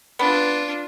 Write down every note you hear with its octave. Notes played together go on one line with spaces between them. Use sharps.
B3 D4 F4 B4